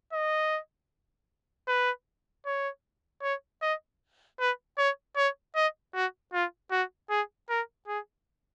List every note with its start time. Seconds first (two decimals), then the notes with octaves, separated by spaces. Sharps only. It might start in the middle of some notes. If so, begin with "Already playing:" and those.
0.13 D#5
1.67 B4
2.46 C#5
3.22 C#5
3.62 D#5
4.39 B4
4.78 C#5
5.16 C#5
5.55 D#5
5.94 F#4
6.33 F4
6.71 F#4
7.10 G#4
7.49 A#4
7.87 G#4